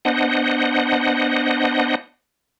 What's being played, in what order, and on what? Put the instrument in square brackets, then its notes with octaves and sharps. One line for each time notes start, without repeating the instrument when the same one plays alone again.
[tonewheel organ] B3 D4 C5 D#5 F#5